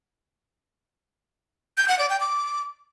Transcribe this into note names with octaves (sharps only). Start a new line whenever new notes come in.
G6
F#5
D5
G5
D6